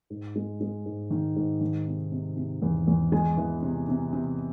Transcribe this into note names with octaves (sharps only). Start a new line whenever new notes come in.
G#2
G#3
G#3
G#2
D#3
G#2
D#3
C3
C3
C3
E2
E2
G#3 G#5
E3
C3
C3
C3